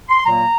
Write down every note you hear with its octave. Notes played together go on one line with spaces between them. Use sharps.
C6
C6
A#2 F#3 A#3 A#5